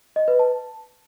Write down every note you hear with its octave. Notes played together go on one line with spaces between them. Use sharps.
D#5
B4
A5